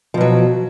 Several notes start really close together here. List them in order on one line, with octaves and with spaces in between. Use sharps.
F3 B2 F#3